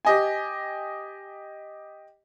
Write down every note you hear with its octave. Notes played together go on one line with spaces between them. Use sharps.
G4 D#5 G#5